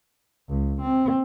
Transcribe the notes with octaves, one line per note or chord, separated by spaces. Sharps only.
C#2
C4